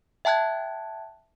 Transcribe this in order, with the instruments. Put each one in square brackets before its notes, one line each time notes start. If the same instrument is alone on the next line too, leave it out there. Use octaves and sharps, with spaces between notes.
[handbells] E5 G5 A5 F#6 G#6